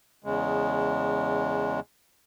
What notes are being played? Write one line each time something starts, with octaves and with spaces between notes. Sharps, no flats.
E2 C#3 G#3